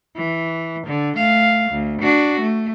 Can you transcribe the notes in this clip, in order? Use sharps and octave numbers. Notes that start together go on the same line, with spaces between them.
E3
D3
A3 F5
D2
D4 F#4
A3